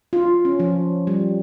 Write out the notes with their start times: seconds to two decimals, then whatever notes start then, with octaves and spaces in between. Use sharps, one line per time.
0.13 F4
0.45 C#4
0.60 F3
1.07 G3